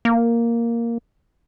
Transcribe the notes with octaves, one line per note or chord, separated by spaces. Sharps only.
A#3